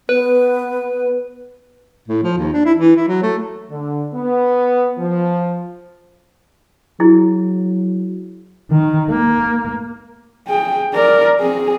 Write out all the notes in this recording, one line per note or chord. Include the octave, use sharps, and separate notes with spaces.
B3 B4
A2
F3
D#2
D4
E4
E3
E4
F#3
A3
D3
B3
F3
F#3 E4 G#4
D#3
A#3
G#4 G5
A#4 D5
C4 G#4